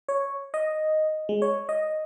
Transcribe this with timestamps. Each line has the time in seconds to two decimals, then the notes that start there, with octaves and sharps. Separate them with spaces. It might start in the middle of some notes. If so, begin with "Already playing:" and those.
0.09 C#5
0.54 D#5
1.29 G#3
1.42 C#5
1.69 D#5